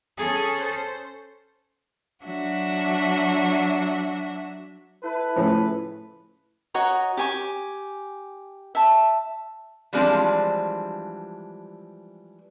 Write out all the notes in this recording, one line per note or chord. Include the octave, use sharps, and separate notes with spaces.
C#4 G#4 A4
C5
F#3 D4 F#4 E5
E4 A4 B4
A2 C#3 F3
F#4 C#5 D#5 A#5
G4 G#5 C#6
E5 A5
E3 F3 G3 G#3 C4 D4